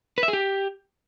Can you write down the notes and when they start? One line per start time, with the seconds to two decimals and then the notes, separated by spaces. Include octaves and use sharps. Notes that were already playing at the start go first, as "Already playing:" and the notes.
0.18 B4
0.23 E5
0.28 G#4
0.33 G4